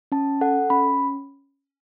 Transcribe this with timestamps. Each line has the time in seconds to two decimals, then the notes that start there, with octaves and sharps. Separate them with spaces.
0.12 C#4 A5
0.41 A4 F#5
0.70 C#4 B5